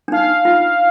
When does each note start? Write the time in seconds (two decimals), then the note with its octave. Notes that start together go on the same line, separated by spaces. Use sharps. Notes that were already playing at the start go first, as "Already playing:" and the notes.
0.08 D4
0.12 D#4 F5
0.45 F4